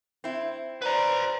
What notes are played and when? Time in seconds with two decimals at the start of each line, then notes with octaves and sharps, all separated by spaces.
0.24 C4 E4
0.82 B4 C5 D5 A#5